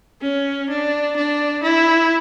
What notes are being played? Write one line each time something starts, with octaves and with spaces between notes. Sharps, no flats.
C#4
D4
D4
E4